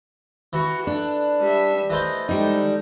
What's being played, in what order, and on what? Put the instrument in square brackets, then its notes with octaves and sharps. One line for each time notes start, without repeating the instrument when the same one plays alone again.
[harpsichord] E3 [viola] F#4
[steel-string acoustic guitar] D4 [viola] A4
[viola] G3 E5
[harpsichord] E3 A3 C5 [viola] D#5
[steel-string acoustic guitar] G3 D#4 [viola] G#3 A4